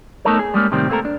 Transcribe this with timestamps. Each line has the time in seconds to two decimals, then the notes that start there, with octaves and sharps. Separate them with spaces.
0.25 A3 B3 D#4 A4 A#4 C#5
0.39 G#4
0.54 G3 G#3 A#3 C#4
0.71 A2 C3 D#3 G3 C4
0.89 A3 A#3 C4 D#4 A4 A#4
1.05 D4